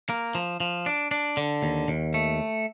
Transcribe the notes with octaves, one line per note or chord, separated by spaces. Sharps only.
A#3
F3
F3
D4
D4
D3
D#2
D#2
A3